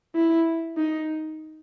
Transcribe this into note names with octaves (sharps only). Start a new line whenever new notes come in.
E4
D#4